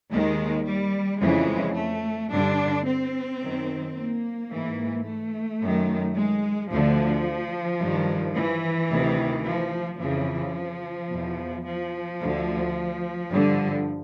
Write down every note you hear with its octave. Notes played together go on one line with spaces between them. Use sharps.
D#2 D#3 G#3
G3
F2 C#3 E3 G#3
A3
G2 D3 D4
C4
F#2 D#3
A#3
G#2 E3
A3
F#2 D#3
G#3
D2 D3 F3
G2 D#3
E3
D2 C3 D#3
F3
F2 C#3 E3 F3
E2 B2
F3
D2 D3
G2 D3